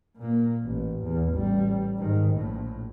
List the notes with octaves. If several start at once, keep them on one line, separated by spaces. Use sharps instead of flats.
A#2 A#3
A1
E2
A1 G3
G#2 D#3
A#1 A2